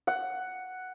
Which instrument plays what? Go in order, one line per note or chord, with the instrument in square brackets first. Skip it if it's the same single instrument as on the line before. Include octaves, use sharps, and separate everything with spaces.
[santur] F#5